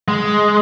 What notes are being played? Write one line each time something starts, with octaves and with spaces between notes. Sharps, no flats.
G#3